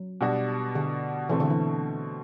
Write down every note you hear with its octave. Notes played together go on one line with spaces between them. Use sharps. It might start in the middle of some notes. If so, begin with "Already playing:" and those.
Already playing: F#3
B2 G3 D4 F#4
D3
B2 E3 A3 C4
D3
E3